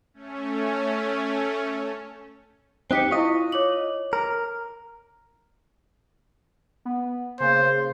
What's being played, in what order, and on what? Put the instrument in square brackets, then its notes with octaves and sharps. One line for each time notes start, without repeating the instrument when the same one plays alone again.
[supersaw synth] A3 C#4
[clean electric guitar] C4 D#4 G4 [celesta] F#6 B6 C#7
[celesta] E4 C#6 [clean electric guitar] F4 D#5
[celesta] C#5 D6 F#7
[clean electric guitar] A#4
[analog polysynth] B3
[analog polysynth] C#3 A#3 [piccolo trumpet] C5